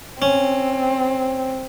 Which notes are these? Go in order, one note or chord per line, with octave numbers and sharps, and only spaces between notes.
C4 C#4